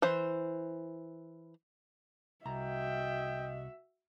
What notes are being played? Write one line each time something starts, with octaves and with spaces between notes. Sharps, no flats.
E3 C5
C2 F#4 D#5 E5 G5 A#5